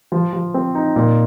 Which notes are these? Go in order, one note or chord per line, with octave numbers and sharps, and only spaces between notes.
F3
F3
C4
D#4
A#2